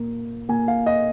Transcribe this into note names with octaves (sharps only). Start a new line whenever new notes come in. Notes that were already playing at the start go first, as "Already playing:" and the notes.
Already playing: A#2 A#3
A#2 A#3 G#5
F5
D#5